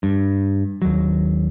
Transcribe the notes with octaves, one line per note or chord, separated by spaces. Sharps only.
G2
D#2 F#3